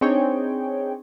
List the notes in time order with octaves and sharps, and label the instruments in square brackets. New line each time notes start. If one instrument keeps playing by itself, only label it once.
[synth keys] C4 D4 D#4 G#4 C#5 G5